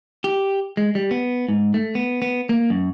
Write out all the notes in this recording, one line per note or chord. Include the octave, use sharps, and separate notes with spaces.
G4
G#3
G3
B3
G#2
A3
B3
B3
A#3
F#2